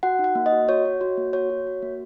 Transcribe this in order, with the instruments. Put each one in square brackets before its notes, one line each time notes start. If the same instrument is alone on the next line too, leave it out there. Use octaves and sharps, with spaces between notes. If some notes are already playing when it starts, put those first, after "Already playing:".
[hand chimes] F#4 F#5
D#4
F#5
A#3
D#5
F#4
F#4 C#5
F#4
F#4
A#3
F#4 C#5
F#4
F#4
A#3